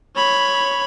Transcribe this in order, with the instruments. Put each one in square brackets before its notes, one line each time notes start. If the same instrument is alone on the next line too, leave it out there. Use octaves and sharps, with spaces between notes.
[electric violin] C#5 B5